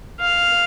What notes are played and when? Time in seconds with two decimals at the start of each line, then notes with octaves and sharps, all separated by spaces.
0.21 F5